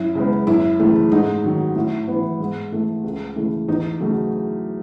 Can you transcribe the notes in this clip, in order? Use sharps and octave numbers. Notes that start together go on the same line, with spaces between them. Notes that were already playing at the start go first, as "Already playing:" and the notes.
Already playing: F#2 E4
C#3 G#3 B3
F#2 E4
C#3 E3 A3
G#2 D#4
D#3 F#3
A2
E3 B3
G#2
E3 A3
C#2
C#3 E3 A3
E2 D#4
C#3 F#3 A3